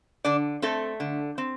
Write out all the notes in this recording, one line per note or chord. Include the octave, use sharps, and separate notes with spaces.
D3 D4 D5
A3 C4 A4
D3
C4